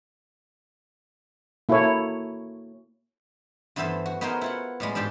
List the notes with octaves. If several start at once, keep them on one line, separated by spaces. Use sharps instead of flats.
A#3 E4 F#4 A4 C#5
G2 E3 B3 A4 C5 E5
F#4
B3 D#4 F#4 G#4 A#4 C5
E4 F4 F#5
A2 G3 G#3
G#2 D4 G4 G5 A5 C6